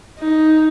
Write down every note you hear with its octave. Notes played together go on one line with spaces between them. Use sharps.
D#4